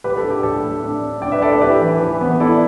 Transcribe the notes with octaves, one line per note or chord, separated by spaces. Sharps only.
A2 G4 B4
A4
D4
G4
A2 A4
A2
D4
D4
D4 D5 G5
B4 E5
A2 A4 D5
A4 D5
E4 G4 B4
E3
E3
B3
E4 A4 D5